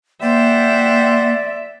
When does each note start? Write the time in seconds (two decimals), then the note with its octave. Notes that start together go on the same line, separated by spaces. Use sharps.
0.22 A#3 C5 D5 E5 F#5 G5